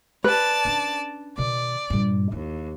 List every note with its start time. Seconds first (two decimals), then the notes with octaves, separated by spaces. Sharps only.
0.24 B4 D5 A5
0.65 C#4 D4
1.38 B2 D#3 D5
1.90 G2 A#2
2.32 D#2 E4